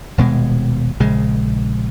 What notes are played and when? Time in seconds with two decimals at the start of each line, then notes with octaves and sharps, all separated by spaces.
0.18 D#1 B2 G#3
1.00 A#1 C#3 G#3